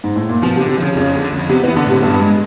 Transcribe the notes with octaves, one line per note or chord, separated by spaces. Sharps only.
G#2
A2
A#2
B2 F3
C3
D3
C3
C#3 F3
F2 C#3
D3
F2
C3 B3
E3
B3
D3
A2 C3
G2 B3
G#3